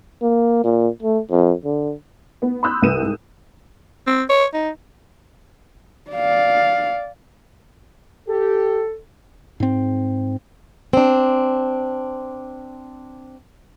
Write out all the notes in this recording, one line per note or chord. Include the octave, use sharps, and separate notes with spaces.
A#3
A#2
A3
F2
D3
B3
B5 C6 D#6 E6 F#6 G6
C2 B4 D#7 E7
G#2
C4
C#5
D#4
D5 F5
G4 A4
G#2 C4
C4 D4